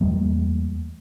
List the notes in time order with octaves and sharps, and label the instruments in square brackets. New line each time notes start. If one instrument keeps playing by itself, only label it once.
[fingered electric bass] E2 G3 A3 A#3